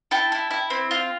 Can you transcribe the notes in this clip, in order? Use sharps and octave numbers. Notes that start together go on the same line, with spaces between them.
E4 G5 A5
E4
E4
C4
F4